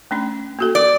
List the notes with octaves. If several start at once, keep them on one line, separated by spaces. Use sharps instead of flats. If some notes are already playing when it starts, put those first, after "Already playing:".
A3 C#4 D4
A#3 F#4 A4
D5